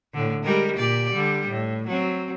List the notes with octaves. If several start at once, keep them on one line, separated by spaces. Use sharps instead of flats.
A2 D3
G3 G#3 A#4
A#2 G4 D5
D3 G3
A2
F#3 C4